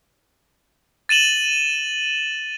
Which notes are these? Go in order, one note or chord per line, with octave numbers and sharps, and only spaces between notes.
A6 D#7 E7 F#7 G7